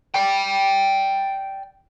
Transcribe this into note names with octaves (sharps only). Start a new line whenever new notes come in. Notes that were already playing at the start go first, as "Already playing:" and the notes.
D5 G5